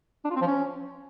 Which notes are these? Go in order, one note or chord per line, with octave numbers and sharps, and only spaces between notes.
D4
F4
C4
F3
C#4